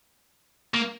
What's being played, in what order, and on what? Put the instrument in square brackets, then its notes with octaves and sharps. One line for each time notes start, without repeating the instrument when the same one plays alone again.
[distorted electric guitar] A#3